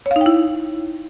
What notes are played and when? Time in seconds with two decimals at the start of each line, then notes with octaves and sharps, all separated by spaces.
0.06 C#5
0.11 F5
0.16 D#4
0.21 G5
0.26 E4